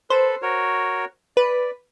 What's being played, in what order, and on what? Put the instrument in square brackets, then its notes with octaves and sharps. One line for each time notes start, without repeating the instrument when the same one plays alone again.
[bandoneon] A4 B4 [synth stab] C5
[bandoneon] F#4 A#4 C#5
[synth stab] B4 [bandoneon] D5